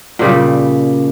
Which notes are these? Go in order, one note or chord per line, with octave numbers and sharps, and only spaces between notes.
A#2 C#3 G3